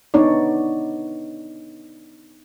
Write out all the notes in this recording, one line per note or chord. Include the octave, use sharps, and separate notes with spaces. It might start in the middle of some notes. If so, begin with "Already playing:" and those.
B3 D4 D#4 C#5 D5